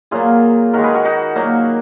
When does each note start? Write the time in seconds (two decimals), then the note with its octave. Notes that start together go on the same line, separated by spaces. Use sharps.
0.11 A#2 F#3 A#3 F4 G#4
0.73 D#3 G#3 F#4 A#4
0.83 G#4 B4
0.94 F#4 A#4
1.05 D#4 F#4
1.35 A#2 F#3 A#3